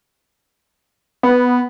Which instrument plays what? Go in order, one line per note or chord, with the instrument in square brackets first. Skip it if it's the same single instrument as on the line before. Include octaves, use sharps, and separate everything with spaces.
[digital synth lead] B3